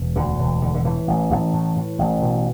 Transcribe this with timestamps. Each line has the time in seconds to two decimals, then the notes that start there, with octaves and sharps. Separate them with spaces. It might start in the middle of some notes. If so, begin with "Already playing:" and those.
Already playing: E1
0.16 D2 D3
0.39 E1
0.62 D3
0.74 D3
0.84 A2 E3
1.08 A1
1.30 A1
1.53 A2
1.76 A2
1.99 A1
2.22 B2